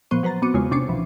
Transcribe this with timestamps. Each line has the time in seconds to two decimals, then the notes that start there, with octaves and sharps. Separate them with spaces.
0.11 A#2 F3 B3 C5 C#6 D#7
0.23 F#3 B4 C5 A#5 A6
0.42 B3 C4 F#4 D6 C#7 D#7
0.54 E2 C#3 G#3 F4 C#5
0.71 C3 C#4 D4 D6 C7 C#7
0.88 C2 B2 E3 F3